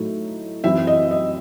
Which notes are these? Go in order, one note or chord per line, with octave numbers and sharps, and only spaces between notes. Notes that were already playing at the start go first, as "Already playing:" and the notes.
Already playing: A2 F#3 A3 D#4
F#2 E3 C4 E4 E5
D#5
D#5